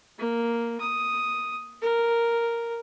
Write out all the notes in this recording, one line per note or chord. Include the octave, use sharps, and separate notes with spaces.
A#3
D#6
A#4